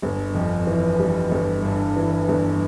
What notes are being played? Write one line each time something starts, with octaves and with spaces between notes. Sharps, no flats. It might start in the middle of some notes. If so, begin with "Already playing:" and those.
G1
F2
E3
G3
G1
G2
E3
G1